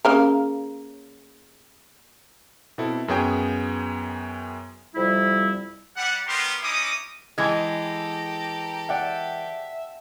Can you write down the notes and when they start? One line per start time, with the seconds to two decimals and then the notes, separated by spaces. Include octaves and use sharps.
0.05 C#3 A#3 A#4
2.78 B2 C4 E4 A4
3.08 F#2 B3 G#4 C#5 G5
4.95 F2 C3 G3 E4
5.97 G3 F#5
6.26 G3 B3 G4 A#4 A#5 C6
6.62 C#4 D#4 E4 D6 D#6
7.38 E3 G#3 G4 A4 G#5 A#5 G#6
8.89 D5 E5 F#5 G5